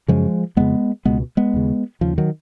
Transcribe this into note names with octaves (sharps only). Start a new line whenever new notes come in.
F#2 C#3 F3 G#3
F2 C#3 G#3 B3
C#2 B2 G#3 B3
G#3 B3
D#2 C#3
D#2 C#3 F3
D#3 F#3